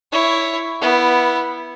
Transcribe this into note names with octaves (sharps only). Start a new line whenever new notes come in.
E4 C#5
B3 E4